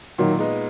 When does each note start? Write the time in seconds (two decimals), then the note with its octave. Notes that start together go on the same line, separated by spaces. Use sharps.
0.18 A#2 D#3 F#3
0.39 G#3 B3 D#4